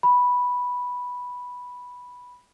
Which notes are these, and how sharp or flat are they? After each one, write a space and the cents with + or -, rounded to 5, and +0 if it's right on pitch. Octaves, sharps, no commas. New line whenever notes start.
B5 -5